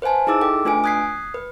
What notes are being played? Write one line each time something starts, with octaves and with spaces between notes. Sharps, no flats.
B4 C5 F5 G#5 A5
D#4 E4 G#4 D6 E6 A6
A4 G5 D6
A3 D4 F4 B4 G#5 D7
D#6 F#6 G#6 B6 C7
B4